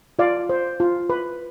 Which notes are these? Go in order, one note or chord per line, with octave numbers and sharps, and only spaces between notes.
F4 D5 F5
C5
F4
B4